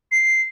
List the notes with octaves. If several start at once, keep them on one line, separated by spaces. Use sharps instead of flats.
C7